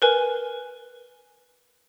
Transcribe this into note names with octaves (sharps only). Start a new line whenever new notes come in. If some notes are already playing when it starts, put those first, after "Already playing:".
A#4 B4 G#5